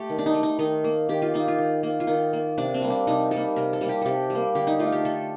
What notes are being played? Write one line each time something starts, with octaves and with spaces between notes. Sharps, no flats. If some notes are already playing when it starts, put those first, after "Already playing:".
Already playing: A3 G4 A4
D#3
D4
D#4
A3
D#4
D#3 D#4
A#3
D#3 G4
F4
A#3 D#4
F4
D#3
A#3
F4
D#3 D#4
A#3
C3 D4
C4
G3 A#3
D4
C3 D#4
G3 A#3 A4
C3 A#4
A4
G3 A#3
G4
C3 G4 A4
G3
A#3
D3 G4
D#4
A3 F4
G4
D3 A4